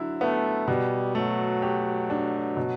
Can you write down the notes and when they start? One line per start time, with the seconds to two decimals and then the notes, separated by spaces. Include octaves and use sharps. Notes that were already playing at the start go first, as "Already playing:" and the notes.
Already playing: D3 F#3 E4
0.21 A3 B3
0.68 B2 G3
1.15 F#3 A3
1.62 G4
2.10 D4
2.57 B2